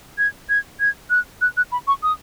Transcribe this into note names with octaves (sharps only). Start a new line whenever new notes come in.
G#6
G#6
G#6
F#6
F#6
F#6
B5
C#6
D#6